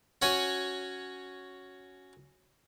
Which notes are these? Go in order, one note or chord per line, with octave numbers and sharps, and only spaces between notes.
C#4 F#4 C#5 G#5